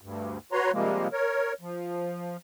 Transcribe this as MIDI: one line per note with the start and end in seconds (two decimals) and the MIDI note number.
0.01 0.38 38
0.01 0.38 43
0.52 0.72 66
0.52 0.72 71
0.52 0.72 73
0.52 0.72 82
0.52 0.72 84
0.73 1.08 48
0.73 1.08 53
0.73 1.08 55
0.73 1.08 56
0.73 1.08 58
1.12 1.53 70
1.12 1.53 73
1.61 2.37 53